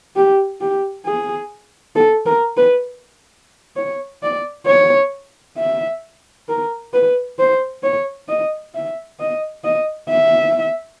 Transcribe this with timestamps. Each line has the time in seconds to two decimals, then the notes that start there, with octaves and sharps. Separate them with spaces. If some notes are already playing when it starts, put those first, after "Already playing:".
0.16 G4
0.61 G4
1.06 G#4
1.96 A4
2.26 A#4
2.57 B4
3.77 C#5
4.23 D5
4.67 C#5
5.58 E5
6.49 A#4
6.93 B4
7.39 C5
7.83 C#5
8.28 D#5
8.75 E5
9.20 D#5
9.64 D#5
10.10 E5